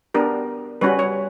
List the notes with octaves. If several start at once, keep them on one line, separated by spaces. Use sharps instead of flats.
B3 D4 G4 A#4
G3 C#4 F#4 B4
C#5